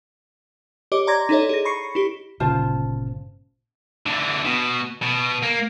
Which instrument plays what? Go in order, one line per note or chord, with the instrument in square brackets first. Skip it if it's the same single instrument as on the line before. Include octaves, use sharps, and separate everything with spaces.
[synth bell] G4 C#5 D#5 D6
D5 A#5 C6 D6 G#6 A#6
D#4 E4 A4 C#5 D#5
G#4 A#6
B5 C#6 C7 C#7
E4 G4
[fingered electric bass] G1 A#2 C#3 [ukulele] F4 C5 A5
[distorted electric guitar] D3 E3
B2
B2
A#3